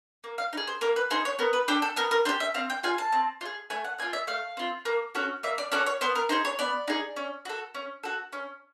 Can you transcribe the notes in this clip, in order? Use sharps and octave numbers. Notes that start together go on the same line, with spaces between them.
A#3
F5
D#4
G#4
C5
A#3 A#4
B4
D#4 G#4 C5
C#5
B3 A#4
B4
D4 G4 A4
A4
B3 A#4
A#4
D4 C5
G4
E5
C4 F5
G5
F4 G#4 G#5
A5
C4
F4
G#4
A3 G#5
F#5
C4 F4 G#5
E5
A3 F5
C4 F4
A#3
C#4 F#4 A4
A#3 E5
D5
C#4 F#4 A4 D5
C#5
B3 C5
A#4
D#4 G#4 C5
C#5
B3 D5
D#4 G#4
C#4
F#4 A4
C#4
F#4 A4
C#4